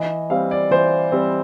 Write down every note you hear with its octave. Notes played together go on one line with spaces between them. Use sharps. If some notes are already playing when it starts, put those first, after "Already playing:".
Already playing: E3 D#5
G3 C4 F5
D5
E3 C5
G3 C4